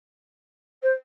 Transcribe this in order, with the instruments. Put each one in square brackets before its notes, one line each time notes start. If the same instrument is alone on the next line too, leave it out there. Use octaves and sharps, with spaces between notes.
[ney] C5